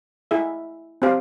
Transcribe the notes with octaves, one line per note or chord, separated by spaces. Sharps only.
E4 G#4 E5
C4 G4 C5 F5